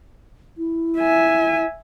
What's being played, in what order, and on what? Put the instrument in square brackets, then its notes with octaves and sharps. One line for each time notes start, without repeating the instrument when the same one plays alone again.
[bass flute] E4
[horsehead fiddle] E5 G#5